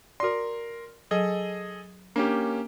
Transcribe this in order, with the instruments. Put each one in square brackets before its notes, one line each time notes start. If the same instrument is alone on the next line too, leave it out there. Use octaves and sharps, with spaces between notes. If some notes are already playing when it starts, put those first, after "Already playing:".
[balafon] F#4 D5 [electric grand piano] A#4 C6
[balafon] F#3 [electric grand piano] G#4 A4 D#5
[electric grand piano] A#3 C#4 G4 [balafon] D4